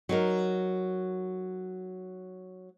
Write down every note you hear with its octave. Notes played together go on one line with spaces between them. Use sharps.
F#3 D#4 A#4